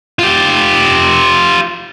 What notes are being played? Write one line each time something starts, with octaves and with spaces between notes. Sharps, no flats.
F4 G4